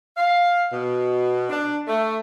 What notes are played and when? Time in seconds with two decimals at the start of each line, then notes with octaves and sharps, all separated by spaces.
0.16 F5
0.71 B2
1.49 D4
1.87 A3